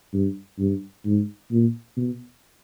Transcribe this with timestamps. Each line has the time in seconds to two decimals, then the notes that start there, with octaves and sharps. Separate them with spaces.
0.13 G2
0.59 G2
1.05 G#2
1.51 A#2
1.97 B2